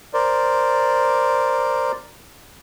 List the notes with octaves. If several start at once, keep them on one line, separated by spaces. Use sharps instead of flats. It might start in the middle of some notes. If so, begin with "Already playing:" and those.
A#4 C5 D5